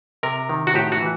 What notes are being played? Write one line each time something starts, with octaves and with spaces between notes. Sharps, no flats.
C3 A#4
D#3
F#4
A2 G4
F#4
E3